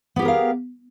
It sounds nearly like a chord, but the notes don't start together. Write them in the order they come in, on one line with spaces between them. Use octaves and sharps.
B3 G4 G#4 A#4 F5